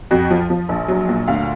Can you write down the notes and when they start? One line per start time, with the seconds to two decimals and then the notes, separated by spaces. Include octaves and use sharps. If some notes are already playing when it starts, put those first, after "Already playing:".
0.11 F2 F#4
0.31 F3
0.50 F3
0.69 A#1
0.88 F#3
1.09 A#2
1.28 D2 F5